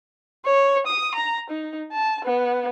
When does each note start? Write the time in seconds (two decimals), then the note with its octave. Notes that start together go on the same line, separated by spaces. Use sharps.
0.45 C#5
0.87 D#6
1.15 A#5
1.50 D#4
1.92 A5
2.25 B3